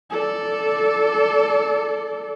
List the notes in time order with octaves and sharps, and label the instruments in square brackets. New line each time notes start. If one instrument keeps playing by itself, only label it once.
[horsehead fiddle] A4 D5